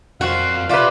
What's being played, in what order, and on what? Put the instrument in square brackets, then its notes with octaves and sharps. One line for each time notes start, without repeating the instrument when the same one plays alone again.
[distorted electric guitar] F2 C5 [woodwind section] A#2 F5 [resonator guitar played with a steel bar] F#4
[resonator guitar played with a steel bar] F4 B4 [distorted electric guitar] G4 E5 [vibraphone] D5 D6